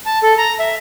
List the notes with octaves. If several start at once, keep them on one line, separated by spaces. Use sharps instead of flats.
A5
A4
A#5
E5